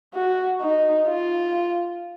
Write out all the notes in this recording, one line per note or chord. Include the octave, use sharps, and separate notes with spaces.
F#4
D#4
F4